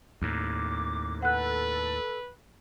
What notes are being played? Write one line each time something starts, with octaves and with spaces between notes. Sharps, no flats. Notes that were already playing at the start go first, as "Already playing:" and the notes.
D#2 A2 D6
A4 B4 F#5 F#6